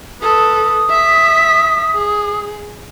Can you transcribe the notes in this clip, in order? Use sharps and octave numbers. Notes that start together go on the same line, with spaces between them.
A4 B4 D#6
E5 B6
G#4